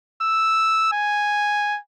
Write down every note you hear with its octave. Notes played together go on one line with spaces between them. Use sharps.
E6
G#5